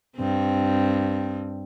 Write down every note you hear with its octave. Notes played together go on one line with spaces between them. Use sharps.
G2 C4